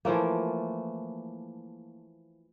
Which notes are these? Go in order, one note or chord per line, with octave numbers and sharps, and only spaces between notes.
E3 F3 A3 A#3